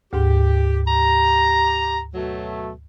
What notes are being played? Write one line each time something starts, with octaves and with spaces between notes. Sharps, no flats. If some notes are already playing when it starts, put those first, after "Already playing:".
D2 G#2 G4
G4 A#5
B2 F#3 A3